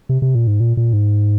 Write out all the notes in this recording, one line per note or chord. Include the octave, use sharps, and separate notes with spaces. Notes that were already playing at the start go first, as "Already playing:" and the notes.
C3
C3
A#2
G#2
A#2
A#2
G#2